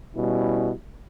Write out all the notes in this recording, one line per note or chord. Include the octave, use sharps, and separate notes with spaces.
B2 G3 C#4 E4